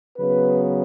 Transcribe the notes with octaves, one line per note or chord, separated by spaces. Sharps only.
C#3 F#3 B3 B4